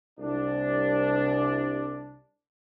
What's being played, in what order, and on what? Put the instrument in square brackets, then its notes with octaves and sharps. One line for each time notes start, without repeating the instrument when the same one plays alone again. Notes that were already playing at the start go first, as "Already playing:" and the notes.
[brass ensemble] C2 D4